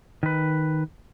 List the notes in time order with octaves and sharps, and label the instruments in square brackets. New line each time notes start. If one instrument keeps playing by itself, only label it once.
[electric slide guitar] D#3 B4